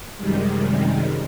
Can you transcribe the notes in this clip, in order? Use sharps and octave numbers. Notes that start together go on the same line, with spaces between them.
F#2 C3 D#3 G3 G#3